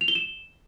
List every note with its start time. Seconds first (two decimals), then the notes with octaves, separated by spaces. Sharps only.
0.01 F7
0.08 G7
0.15 E7